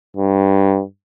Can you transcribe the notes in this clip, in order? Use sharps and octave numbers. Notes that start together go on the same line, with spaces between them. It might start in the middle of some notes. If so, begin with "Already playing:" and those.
G2